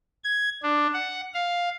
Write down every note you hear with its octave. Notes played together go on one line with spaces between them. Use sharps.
G#6
D4
F#5
F5